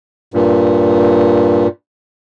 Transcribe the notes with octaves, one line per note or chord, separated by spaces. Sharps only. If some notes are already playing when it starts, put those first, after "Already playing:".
G2 A#2